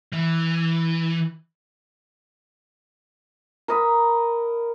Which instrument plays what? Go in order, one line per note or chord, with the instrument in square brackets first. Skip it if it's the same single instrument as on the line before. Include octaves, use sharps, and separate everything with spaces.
[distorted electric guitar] E3
[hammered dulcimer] A#4 D#5 B5